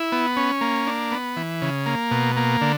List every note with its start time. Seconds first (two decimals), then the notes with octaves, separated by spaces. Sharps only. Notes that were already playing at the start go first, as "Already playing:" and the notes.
Already playing: E4
0.12 B3
0.36 C#4
0.61 A#3
0.87 D4
1.12 B3
1.36 E3
1.62 C#3
1.86 A#3
2.11 B2
2.36 A#3
2.61 D3